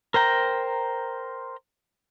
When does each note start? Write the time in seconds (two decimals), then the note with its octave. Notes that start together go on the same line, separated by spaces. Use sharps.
0.14 A#4 C5 G5 A#5